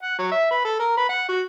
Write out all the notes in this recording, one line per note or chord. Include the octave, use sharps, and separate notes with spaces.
F#5
F#3
E5
B4
A4
A#4
B4
F#5
F#4